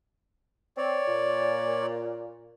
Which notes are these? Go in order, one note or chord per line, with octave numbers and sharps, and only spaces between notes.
C4 C#5 D5
A#2